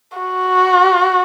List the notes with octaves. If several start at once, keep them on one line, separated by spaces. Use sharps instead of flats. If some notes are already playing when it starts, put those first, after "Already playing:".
F#4